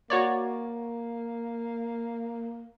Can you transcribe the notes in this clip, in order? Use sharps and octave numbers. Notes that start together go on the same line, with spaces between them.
A#3 F#4 C#5 D5